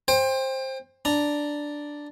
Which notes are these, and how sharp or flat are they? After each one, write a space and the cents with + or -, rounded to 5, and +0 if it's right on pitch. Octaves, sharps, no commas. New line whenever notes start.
C5 +15 G5 +30
D4 +0 A#5 +0